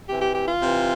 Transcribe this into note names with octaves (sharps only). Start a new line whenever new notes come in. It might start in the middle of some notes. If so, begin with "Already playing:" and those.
C3 E3 G4
G4
G4
F4
C3 E3